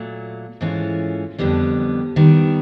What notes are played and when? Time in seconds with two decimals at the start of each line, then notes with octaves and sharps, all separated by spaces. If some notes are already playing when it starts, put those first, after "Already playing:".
Already playing: A#2 F#3 A3
0.61 G#2 E3 A3 C#4 F4
1.39 F2 D3 G3 B3
2.16 D#3 G3 B3